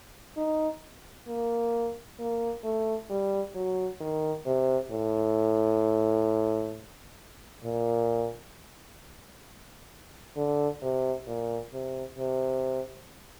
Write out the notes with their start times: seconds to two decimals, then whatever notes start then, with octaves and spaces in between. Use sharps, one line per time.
0.37 D#4
1.28 A#3
2.19 A#3
2.64 A3
3.10 G3
3.55 F#3
4.00 D#3
4.46 C3
4.91 A2
7.64 A#2
10.36 D3
10.82 C3
11.27 A#2
11.73 C3
12.18 C3